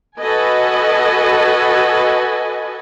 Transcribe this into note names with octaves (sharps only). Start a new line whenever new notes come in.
F#4 A4 B4 D#5 G#5